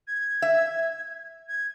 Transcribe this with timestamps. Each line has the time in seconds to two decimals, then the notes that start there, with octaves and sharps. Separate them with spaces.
0.07 G#6
0.42 E5
1.48 G#6